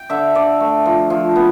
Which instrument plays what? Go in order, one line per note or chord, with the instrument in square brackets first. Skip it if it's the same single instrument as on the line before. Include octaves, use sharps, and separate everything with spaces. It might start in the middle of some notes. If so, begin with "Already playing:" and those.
Already playing: [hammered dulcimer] G5
D3 E5
D3 D5
A3
F3
F3
B3